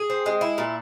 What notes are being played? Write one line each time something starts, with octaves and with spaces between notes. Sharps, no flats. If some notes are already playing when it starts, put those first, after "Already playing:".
Already playing: G#4
C4
G#3
E4
A#2